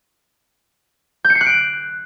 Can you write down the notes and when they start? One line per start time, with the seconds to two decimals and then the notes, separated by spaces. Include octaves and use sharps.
1.25 G6
1.30 C#7
1.35 C7
1.41 F#6
1.46 D7